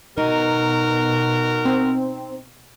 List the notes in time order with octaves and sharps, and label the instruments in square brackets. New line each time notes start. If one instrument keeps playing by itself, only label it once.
[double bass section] B2 [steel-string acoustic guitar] D#4 [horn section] F#4 A#4
[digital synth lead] C4